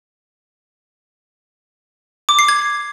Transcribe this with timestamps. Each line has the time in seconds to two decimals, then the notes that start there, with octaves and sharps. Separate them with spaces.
2.29 D6
2.39 C7
2.49 G#6